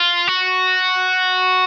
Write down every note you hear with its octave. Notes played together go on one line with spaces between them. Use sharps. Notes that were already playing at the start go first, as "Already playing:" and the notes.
Already playing: F4
F#4